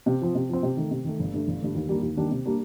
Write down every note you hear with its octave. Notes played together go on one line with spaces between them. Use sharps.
C3
F3 C4
C3
F3 C4
C3
D#3 A3
C3
D#3 A3
G1
G2 D3 A3
G1
G2 D3 A3
D#2
D#3 G3 A#3 D4
D#2
D#3 G3 A#3 D4
C3
G3 A#3 D4